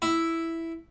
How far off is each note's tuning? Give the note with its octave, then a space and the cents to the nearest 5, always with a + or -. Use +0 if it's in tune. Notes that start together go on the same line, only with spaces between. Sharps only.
E4 +0